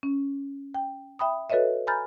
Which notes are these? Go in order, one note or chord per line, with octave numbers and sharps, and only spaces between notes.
C#4
G5
E5 G5 B5 D#6
F#4 A4 B4 C#5 D#5 E5
G#5 A#5 B5 F6 G6 A6